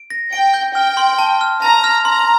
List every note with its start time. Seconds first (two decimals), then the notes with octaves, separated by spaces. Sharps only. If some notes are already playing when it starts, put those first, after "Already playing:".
Already playing: D7
0.10 A#6
0.33 G5 D7
0.54 G6
0.75 G5 F6
0.97 C6
1.19 A5
1.41 F6
1.62 A5 A#5
1.84 F6
2.05 A#5 C6